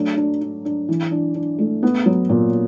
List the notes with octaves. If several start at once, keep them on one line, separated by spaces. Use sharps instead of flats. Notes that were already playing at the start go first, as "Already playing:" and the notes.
Already playing: F#3 A3 D4
D4
D4
D4
E3
D4
D4
A3
B3
F#3
A#2